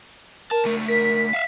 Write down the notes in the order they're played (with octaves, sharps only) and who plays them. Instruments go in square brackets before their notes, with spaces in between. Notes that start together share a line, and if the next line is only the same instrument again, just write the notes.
[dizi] A#4 [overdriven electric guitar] A5
[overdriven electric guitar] C#2 A3
[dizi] A#4 [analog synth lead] B6
[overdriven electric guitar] E5 F5